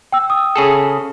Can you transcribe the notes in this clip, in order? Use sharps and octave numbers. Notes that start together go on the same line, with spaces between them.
G5 E6
D#6
C#3 G#4 A4